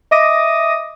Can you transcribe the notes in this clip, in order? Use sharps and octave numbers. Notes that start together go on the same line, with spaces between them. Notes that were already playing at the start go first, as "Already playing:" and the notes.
D#5 E5 D6 D#6 A#6 D#7